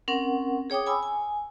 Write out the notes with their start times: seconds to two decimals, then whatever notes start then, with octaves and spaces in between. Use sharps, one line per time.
0.08 C4 C#4 A#4 F#5
0.70 G#4 C#5 G5 D6 D#6
0.86 G#5 B5 E6
1.03 G#5